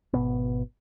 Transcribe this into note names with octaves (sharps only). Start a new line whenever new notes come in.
G#1 E2 B2 B3